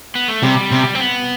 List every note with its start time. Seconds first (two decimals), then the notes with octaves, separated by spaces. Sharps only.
0.15 B3
0.28 A3
0.43 C3 G3
0.71 C3
0.95 C4
1.00 B3